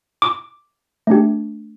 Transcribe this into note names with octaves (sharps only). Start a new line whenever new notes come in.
D6
A3 D4 G4